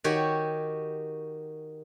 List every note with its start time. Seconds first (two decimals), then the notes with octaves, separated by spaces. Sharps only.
0.04 D#3 F#4 G4 C#5